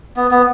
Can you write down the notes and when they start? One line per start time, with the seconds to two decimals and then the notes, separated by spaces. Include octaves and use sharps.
0.16 B3
0.31 B3